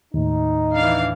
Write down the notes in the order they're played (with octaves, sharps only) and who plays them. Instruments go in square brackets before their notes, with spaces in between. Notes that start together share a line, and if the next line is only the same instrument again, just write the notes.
[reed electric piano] D#2 A2 [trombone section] D#4
[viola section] E3 D4 F5